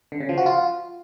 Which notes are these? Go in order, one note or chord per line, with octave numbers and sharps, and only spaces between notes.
D3
C#3
F3
F#4
F4